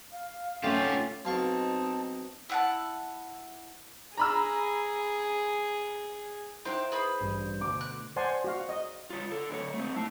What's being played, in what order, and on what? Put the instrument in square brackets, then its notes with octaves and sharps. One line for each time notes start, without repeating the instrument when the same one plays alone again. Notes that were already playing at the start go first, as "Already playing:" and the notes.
[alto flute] F5
[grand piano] A3 F7 [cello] C#4 [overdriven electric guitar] F4 G4
[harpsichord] B1 F5 C#6 [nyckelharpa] C4 D#4 [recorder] A5
[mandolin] E4 F#5 A5
[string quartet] G#4 [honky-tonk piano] A#5 B5 E6
[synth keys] D#4 E4 [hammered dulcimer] C5 [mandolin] F5 G5 F#6
[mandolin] G#4 B4 B5
[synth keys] A1 G2
[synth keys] D2 B2 [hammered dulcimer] D6
[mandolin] F#6
[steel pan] C5 D5 F#5 G#5 A5 C6
F#4 F5
D#5
[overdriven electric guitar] F4 C#5
D3 A4
D2 C#5
A3 C4
E4 A5